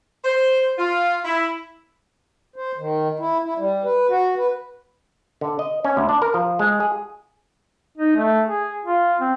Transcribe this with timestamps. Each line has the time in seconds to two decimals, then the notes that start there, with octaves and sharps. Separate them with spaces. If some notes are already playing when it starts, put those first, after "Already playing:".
0.23 C5
0.77 F4
1.24 E4
2.56 C5
2.78 D#3
3.19 E4
3.43 E4
3.58 G3
3.84 B4
4.09 F#4
4.37 B4
5.41 D3
5.59 D#5
5.85 C#4
5.97 D2
6.09 D4
6.22 A#4
6.34 F3
6.59 G#3
6.80 G#4
7.98 D#4
8.16 A3
8.46 G#4
8.85 F4
9.20 C4